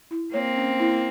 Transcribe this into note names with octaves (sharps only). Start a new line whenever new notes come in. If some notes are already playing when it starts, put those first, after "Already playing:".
E4
A#3 C4 C#5
C#4
E4